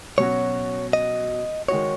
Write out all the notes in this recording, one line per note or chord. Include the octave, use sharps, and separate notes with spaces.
B2 F#3 C#4 F#4 C#5
D#5
D#3 G#3 D#4 F#4 C#5